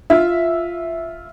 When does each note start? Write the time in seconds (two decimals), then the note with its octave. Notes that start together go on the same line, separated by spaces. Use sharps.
0.10 F4 E5